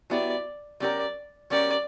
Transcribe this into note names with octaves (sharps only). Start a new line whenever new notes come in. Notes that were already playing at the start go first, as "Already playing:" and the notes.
F#3 B3 E4 G4 D5
F#3 C#4 G4 A#4 D5
F#3 C#4 G4 A#4 D5